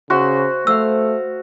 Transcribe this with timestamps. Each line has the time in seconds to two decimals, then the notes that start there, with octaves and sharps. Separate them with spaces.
0.10 C#3 F#4 C5 E5 C6
0.67 A3 C5 F5 E6